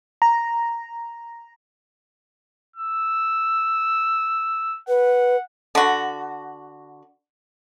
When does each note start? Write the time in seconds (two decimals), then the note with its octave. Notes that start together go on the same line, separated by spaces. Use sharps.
0.22 A#5
2.76 E6
4.88 B4 F#5
5.75 D3 F#4